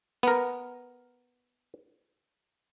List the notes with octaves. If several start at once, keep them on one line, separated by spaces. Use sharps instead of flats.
B3 A#4